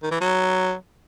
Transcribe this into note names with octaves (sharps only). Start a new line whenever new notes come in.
D#3
E3
F#3